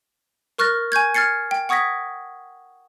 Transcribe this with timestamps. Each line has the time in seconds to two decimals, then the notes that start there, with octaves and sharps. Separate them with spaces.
0.58 A#4 C#6 F6 F#6 A6 A#6
0.92 G#5 C#6 G6 G#6
1.14 F6 G#6 A6 C7 C#7
1.51 G5
1.69 F#5 C#6 D#6 G#6 A#6 B6